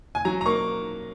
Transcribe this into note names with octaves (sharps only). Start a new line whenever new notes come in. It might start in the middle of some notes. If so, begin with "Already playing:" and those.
G#5
F#3 A#5
A#5
A#3 C#6